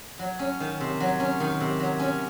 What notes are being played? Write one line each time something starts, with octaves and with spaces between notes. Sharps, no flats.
F#3
C#4
D#3
C3
F#3
C#4
D#3
C3
F#3
C#4